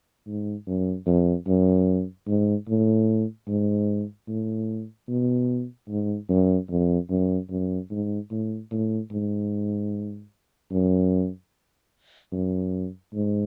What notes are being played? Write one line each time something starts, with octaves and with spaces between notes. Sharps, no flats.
G#2
F#2
F2
F#2
G#2
A2
G#2
A2
B2
G#2
F#2
F2
F#2
F#2
G#2
A2
A2
G#2
F#2
F#2
G#2